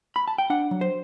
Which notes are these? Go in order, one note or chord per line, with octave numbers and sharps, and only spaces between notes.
B5
A5
G5
D4 F#5
F#3
C5